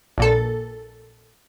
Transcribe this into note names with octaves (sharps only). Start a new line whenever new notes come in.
A#1 A#2 A4